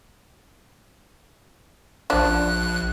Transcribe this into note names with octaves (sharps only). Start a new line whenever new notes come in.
A#1 F3 D4 F#6